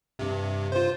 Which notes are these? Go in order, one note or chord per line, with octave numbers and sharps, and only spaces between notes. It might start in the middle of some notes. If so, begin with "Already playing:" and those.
G2 C3
F4 C5